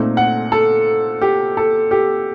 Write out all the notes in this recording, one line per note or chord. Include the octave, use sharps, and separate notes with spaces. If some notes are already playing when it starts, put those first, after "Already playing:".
Already playing: A#2 A3 C4 D#4
F#5
A4
G4
A4
G4